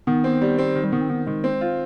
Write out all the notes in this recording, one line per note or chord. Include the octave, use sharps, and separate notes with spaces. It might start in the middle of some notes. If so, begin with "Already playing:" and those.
D#3 B3
C4
G3
C4
D#3
G3
D#3 B3
C4
D#3 B3
D#3 G#3
C4
F4